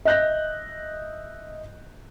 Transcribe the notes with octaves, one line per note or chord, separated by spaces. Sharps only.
D#5 E5 F#6 G6 A#6